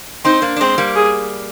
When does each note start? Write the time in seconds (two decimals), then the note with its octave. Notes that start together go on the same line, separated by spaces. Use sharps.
0.25 C4 D#4 C5
0.42 A#3 D4
0.56 D4
0.60 G#3 C4 C5
0.78 G3 A#3
0.96 G#4